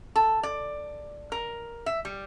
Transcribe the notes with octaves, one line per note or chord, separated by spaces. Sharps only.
A4
D5
A#4
E5
G3